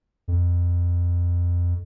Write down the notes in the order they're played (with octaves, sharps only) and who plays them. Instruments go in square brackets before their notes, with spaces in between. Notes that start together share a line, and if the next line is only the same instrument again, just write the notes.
[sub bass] F2